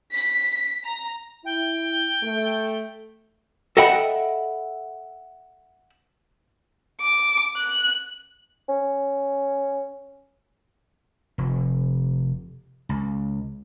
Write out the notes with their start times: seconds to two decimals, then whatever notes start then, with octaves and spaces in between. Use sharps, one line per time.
0.13 B6
0.84 A#5
1.45 E4 G5
2.22 A3
3.77 A4 D#5 E5 F#5 G5 B5
7.01 D6
7.57 F#6
8.69 C#4
11.38 F1
12.89 C#2